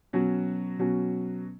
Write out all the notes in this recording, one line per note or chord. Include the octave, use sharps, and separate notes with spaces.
B2 F#3 C#4 F#4
B2 F#3 C#4 F#4